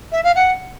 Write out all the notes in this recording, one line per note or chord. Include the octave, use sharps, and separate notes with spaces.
E5
F5
F#5